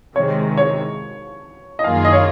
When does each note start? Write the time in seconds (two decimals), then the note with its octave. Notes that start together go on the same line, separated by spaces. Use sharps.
0.16 C3 D#3 G#3 C4 C#5
0.57 C#5
1.79 D#5
1.84 F#2 D#3 A#3 F4 G#4 F5
2.05 D#5
2.13 C#5